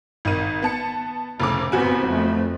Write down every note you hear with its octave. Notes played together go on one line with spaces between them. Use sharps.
G#1 D#3 D#7
B3 A5 C#7
F1 A2 C#3 D6
F#1 B3 C4 F#4 G#5
F2 A3